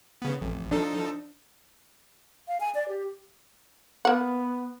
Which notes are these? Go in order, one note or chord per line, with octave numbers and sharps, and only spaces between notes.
C#3 B3
A1 F2
F3 D4 D#4 A4
F5
G#5
D5
G4
A#3 B3 F#5